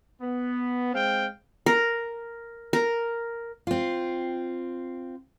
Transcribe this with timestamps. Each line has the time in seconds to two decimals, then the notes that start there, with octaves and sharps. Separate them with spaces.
0.22 B3
0.94 G#3 C4 F5 G5
1.66 A#4
2.73 A#4
3.67 C4 F4